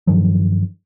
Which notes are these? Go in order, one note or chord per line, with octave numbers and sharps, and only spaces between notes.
G2 D#3 F3 F#3